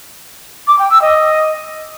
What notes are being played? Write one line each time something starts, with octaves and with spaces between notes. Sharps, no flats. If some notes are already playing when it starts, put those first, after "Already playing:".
D6
G5
E6
D#5